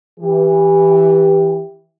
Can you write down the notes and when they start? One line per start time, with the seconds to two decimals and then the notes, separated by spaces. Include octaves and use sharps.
0.20 E3 G4